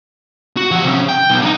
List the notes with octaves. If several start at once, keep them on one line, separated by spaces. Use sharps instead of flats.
F#4
F3 F#5
C3 C#4
G5
B1
D4 D#4